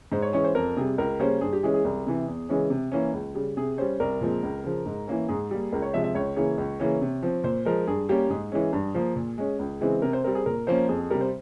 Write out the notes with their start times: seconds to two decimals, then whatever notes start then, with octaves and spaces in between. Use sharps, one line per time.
0.12 G#2 C5
0.22 C#5
0.33 E3 G#3 C#4 C#5
0.44 C5
0.55 F2 A#4
0.77 C3 G3 G#4
0.98 C#2 A#4
1.19 C#3 G3 A#3 C#4 C5
1.41 G2 G#4
1.53 G4
1.63 E3 G#3 C#4 G#4
1.74 G#4
1.84 C2
2.07 C3 E3
2.28 E2
2.49 C#3 E3 G#3 C#4
2.70 C3
2.92 E3 A#3 C#4
3.13 C#2
3.35 C#3 G3
3.57 C3 G#4
3.78 G3 C#4 C5
4.00 C2 A#4
4.21 A#2 F3 G#3 C4
4.43 C#2
4.64 C#3 F3
4.86 G#2
5.07 E3 A#3 C#4
5.28 G#2 G#4
5.51 G3 A#3
5.72 C#2 A#4
5.82 C#5
5.93 C3 F3 G#3 C4 E5
6.04 E5
6.14 C#2 C#5
6.36 C#3 E3 A#3 C#4
6.58 C#2
6.80 C#3 E3 A#3 C#4
7.01 C3
7.22 F3 C4
7.44 A#2 C5
7.65 F3 G#3 A#4
7.87 G2 G#4
8.09 G3 A#3 C#4 G4
8.30 G#2 G#4
8.52 E3 G#3 C#4
8.73 G2
8.95 F3 A#3
9.16 A#2
9.38 G#3 C#4
9.59 C#2
9.81 C#3 E3 G#3 C4
10.02 C3 A#4
10.13 C5
10.24 G3 C4 A#4
10.35 G#4
10.46 A#2 A#4
10.67 F3 A#3 C#4 C5
10.88 F2 G#4
11.00 G#4
11.10 C3 G3 A#4
11.21 C5